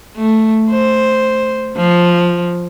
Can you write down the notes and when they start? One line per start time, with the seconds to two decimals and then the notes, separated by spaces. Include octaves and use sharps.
0.17 A3
0.70 C5
1.77 F3